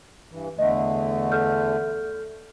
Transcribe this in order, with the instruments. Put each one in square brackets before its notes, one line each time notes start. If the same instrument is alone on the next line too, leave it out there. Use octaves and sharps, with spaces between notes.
[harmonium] G2 E3
[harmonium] E2 D3 A3 [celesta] D#5
[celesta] A4 F6 G6